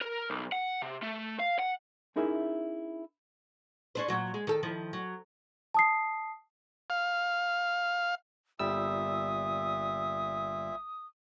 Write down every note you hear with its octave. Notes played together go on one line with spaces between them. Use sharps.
A#4
B1
F#5
C3
A3
F5
F#5
C#4 D#4 E4 G#4 A#4 E5
C#4 D4 C5
A#2 F#3 F#4
G#3
D#3 A4
D#3 F3 E4
F#3
A5 D#6 C7
F5
G1 A#2 G3 E5 D#6 E6